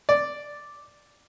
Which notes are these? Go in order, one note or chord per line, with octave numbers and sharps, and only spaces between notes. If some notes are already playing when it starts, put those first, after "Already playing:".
D5